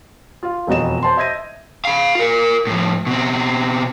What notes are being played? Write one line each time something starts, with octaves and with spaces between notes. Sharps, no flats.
F4 F5
E1 F2 F#3 D#5 E7
C5 A5 C6
D#5 E5 G6 G#6 A#6 D#7
F5 B5
F4 A#4
A2 F3
B2 C4